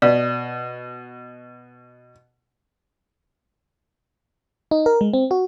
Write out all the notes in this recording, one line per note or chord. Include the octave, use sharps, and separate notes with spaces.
B2 D5
D#4
A#4
G#3
C4
F#4